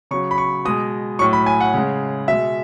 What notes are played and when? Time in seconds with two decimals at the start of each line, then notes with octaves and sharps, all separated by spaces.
0.11 C#3 F#3 C#6
0.31 B5
0.38 C#6
0.65 B2 G#3 D#6
1.19 A2 F#3 C#6
1.33 B5
1.46 G#5
1.60 F#5
1.74 C#3 G#3
2.28 B2 G#3 E5